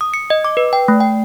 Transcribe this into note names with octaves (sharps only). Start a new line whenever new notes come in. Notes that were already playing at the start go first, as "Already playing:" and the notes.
D#6
C#7
D#5
D6
B4
G5
A3
G5